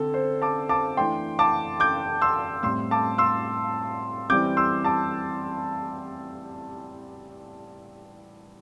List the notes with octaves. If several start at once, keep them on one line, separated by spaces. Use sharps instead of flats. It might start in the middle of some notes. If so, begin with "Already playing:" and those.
Already playing: D3 C4 A4
C5
A5 D6
A5 D6
E3 A3 D4 G5 C6
A5 D6
D6 G6
C6 E6
A2 G3 C4 C6 E6
A5 D6
C6 E6
E3 G3 C4 D6 G6
C6 E6
A5 D6